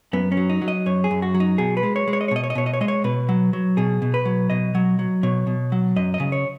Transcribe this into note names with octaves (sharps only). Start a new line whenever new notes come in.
F#2 B3
C#4
F#3
D#4
F#3
D#5
F#2 C#5
G#4
F#2
F#4
F#3
D#4
B2 G#4
B4
G#3
C#5
G#3
C#5
D#5
C#5
B2 D#5
C#5
D#5
B2 C#5
D#5
C#5
G#3 D#5
C#5
B2 B4
F#3
F#3
B2 G#4
B2
B4
F#3
B2 D#5
F#3
F#3
B2 C#5
B2
F#3
F#2 D#5
D#5
C#3
C#5